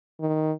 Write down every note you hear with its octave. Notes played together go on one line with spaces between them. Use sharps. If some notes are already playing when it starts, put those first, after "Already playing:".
D#3